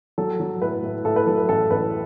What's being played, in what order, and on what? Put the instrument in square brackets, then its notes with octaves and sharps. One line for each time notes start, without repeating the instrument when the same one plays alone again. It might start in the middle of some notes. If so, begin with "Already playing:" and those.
[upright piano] F#3 A4
F#3
A2 B4
A2
A2 A4
B4
F#3 A4
B4
A1 A4
A1 B4